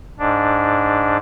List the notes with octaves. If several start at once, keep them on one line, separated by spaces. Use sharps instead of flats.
G#2 D4